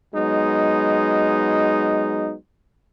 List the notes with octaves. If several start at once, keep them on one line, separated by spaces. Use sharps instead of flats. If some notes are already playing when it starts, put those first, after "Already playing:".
F#3 G#3 B3 D#4